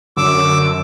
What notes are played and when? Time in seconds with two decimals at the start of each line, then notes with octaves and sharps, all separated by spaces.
0.17 F#2 D3 D6 E6